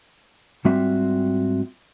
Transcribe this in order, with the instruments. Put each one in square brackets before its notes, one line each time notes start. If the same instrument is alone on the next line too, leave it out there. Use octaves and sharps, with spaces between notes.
[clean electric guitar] G#2 G3 C4 F4 F#4 E5